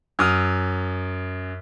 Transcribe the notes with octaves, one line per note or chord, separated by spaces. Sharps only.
F#2 D#6 F6